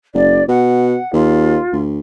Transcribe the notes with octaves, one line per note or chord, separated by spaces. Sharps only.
F#1 D5
B2 F#5
D#2 F4
D2